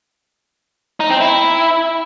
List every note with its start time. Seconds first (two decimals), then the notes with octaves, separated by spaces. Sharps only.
1.00 D#4
1.10 C4
1.21 E4